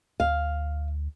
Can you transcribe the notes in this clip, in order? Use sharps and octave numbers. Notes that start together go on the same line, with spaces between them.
D2 F5